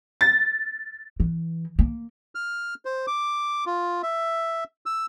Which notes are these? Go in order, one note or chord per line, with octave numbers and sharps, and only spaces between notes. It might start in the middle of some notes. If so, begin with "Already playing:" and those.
A6
E3
A#3
F6
C5
D6
F4
E5
E6